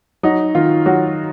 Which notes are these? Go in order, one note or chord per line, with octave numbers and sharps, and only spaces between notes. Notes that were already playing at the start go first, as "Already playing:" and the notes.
F#3 D#4
D#3 F4
F#3 F#4